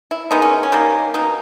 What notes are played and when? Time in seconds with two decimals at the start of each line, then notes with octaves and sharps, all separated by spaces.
0.11 E4
0.31 D#3 G#3 B3 D#4
0.42 C#4
0.63 C#4
0.72 D#3 G3 A#3
1.14 B2 A#3 D#4